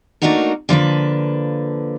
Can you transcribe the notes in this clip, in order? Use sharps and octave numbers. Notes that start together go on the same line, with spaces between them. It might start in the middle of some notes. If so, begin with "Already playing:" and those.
A3 A#3 D4 D#4 F#4 A#4
D3 F3 A#3 B4